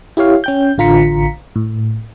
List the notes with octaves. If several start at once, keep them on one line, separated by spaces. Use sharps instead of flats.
E4 G4 C#5 F5
C#4 G5 G6
A1 D3 F4 A#5 B6 C#7
A2